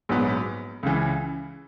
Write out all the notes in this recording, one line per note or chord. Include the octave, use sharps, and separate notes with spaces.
A#1 G#2 F#3 B3
C#2 C#3 E3